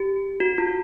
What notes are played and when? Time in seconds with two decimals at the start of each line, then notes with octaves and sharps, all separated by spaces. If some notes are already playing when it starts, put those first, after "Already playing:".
Already playing: G4
0.40 F#4
0.58 F4